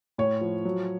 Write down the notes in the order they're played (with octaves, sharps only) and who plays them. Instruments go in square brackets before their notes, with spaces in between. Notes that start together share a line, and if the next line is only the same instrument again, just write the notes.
[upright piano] A2 C#5
F3
F#3